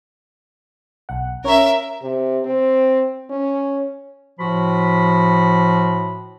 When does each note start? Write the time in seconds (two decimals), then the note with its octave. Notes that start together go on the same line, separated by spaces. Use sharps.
1.09 B1 F#5
1.44 C#4 A#4 C#5 E5
2.02 C3
2.45 C4
3.30 C#4
4.39 A2 F3 F#4 B5